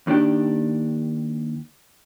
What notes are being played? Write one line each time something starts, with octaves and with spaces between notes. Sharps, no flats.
D#2 D#3 D4 G4